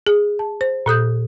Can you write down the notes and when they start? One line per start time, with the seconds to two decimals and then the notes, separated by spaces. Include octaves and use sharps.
0.07 G#4
0.39 A5
0.61 C5
0.86 A#2 A4 D#6 G6